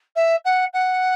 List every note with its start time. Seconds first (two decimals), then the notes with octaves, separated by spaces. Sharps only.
0.15 E5
0.44 F#5
0.73 F#5